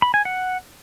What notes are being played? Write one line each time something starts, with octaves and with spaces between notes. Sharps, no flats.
B5
G#5
F#5